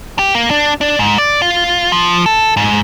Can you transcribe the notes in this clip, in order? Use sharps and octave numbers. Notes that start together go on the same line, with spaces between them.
G4
A#3
D4
D4
G#2
D5
F4
F3
A4
G#2